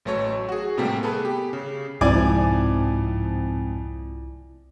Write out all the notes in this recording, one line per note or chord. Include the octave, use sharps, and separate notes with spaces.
A1 F#3 A3 A4 C#5
F#4 G#4
A2 C3 G3 A3 A#3 G4
B3 G#4 A4 B4
G4
C#3
C2 F2 G#2 F3 E4 D5 G#5 D6